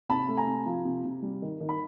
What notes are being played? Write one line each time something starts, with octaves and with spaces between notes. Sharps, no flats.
C3 A5 B5
A3
G#5 A#5
C3
F3
C3
C3
G3
D#3
D#3
B5